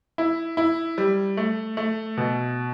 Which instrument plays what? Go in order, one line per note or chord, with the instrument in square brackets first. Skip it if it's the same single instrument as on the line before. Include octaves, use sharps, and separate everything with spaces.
[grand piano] E4
E4
G3
A3
A3
B2